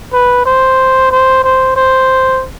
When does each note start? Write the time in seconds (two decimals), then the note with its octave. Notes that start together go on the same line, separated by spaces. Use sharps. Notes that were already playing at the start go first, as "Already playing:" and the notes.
0.13 B4
0.46 C5
1.11 C5
1.44 C5
1.76 C5